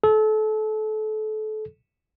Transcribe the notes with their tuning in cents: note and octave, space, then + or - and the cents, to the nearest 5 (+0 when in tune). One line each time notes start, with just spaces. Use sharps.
A4 -30